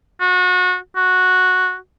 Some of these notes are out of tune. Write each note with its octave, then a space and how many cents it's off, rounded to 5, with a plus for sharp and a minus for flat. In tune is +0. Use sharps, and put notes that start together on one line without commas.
F#4 -30
F#4 -10